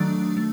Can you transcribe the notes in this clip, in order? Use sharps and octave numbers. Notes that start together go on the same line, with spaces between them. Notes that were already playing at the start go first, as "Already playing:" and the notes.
Already playing: D#3 F#3 A3 D4
A3